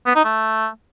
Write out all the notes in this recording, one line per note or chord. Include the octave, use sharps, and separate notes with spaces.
B3
D#4
A3